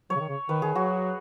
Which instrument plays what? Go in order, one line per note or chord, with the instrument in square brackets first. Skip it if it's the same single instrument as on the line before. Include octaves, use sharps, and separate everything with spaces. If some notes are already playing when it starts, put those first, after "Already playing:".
[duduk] F#3 [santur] C#5
[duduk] C#3
D#3
C#3
[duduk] D#3 [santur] B4
[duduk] D#3 [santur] G#4
[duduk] F#3 [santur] F#4